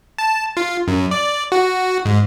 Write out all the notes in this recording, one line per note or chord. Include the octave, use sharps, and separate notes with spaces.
A5
F4
F#2
D5
F#4
G#2